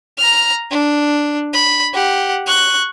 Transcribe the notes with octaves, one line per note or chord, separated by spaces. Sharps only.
A#5 F6
D4
B5
G4 F#5
C#6 F#6